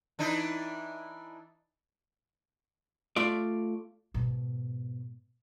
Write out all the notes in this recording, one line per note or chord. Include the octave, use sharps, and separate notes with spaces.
E3 D4 D#4
A3 F4 D5
G#2 B2